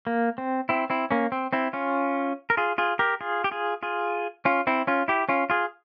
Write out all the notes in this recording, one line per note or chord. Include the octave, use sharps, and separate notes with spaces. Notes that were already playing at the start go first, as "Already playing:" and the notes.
A#3
C4
C4 E4
C4 E4
A#3 C#4
C4
C4 E4
C#4 F4
A#4
F4 G#4
F4 G#4
G4 A#4
F4 G#4
G4
F4 G#4
F4 G#4
C#4 F4
C4 E4
C#4 F4
E4 G4
C#4 F4
F4 G#4